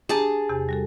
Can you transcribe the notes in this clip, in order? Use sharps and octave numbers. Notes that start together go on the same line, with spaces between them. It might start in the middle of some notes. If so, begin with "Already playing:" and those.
D4 G4 G#4 A5 A#5
E2 C3 G4
G3 F#4 A4